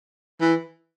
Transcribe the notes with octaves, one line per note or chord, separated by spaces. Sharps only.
E3